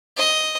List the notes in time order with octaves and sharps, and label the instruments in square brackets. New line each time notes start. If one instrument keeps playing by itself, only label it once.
[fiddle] D#5